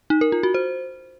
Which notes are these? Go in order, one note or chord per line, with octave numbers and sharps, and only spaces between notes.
D#4
A#4
F4
F#4
C5